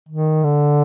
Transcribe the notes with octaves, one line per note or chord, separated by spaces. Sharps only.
D#3
D3